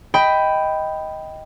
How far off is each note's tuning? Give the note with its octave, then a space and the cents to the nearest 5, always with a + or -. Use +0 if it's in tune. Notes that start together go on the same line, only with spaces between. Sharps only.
D#5 +15 G5 +0 B5 +5